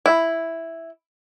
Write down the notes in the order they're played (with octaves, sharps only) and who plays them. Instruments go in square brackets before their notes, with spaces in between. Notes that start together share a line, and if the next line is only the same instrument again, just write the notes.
[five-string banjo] E4